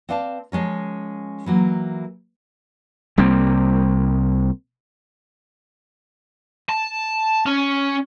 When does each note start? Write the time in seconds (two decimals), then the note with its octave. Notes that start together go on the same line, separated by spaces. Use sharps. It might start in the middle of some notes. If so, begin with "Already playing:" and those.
0.09 C4 B4 D5 F5 G#5 A5
0.52 F3 G#3 C#4 A#4
1.46 E3 F#3 A#3
3.18 C2 G3 A#3 C4
6.69 A5
7.46 C#4